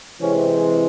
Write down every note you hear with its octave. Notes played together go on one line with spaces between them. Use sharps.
C3 E3 G#3 C4 C#4